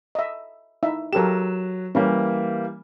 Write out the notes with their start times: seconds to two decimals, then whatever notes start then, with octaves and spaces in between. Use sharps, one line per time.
0.15 D#5 E5
0.83 D#4 E4 E5
1.13 F#3 G4 A4 A#4 E7
1.95 E3 G3 A#3 C#4